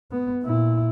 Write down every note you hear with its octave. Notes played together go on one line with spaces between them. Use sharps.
B3
A#2 E4